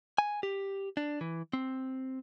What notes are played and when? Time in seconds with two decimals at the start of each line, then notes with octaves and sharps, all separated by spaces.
0.18 G#5
0.43 G4
0.97 D4
1.21 E3
1.53 C4